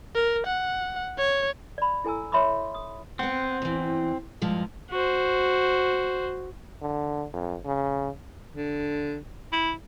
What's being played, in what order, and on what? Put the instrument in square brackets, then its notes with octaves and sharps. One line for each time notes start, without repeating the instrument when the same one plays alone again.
[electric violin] A#4
F#5
C#5
[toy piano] D5 B5
E4 A4 G#5 A#5 E6
C#5 E5 B5 C6 D6 D#6
D#6
[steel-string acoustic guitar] B3 F#5 [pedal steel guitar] C4
[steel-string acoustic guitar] E2 E3
G2 F3 G#3
[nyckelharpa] F#4 C5
[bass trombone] D3
F2
C#3
[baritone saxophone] D3
E4